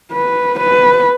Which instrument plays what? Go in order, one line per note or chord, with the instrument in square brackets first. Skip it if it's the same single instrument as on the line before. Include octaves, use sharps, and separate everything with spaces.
[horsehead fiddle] B4
B4